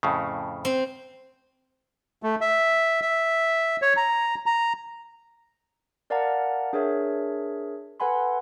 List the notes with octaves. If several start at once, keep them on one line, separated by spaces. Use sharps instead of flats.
F2 A2 C#3
C4
A3
E5
E5
C#5
A#5
A#5
A#4 D5 F5 F#5 A5 A#5
D4 G#4 A#4 C#5 E5
A4 B4 F#5 G#5 B5 C6